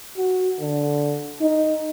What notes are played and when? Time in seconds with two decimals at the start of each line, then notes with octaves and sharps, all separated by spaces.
0.17 F#4
0.60 D3
1.41 D#4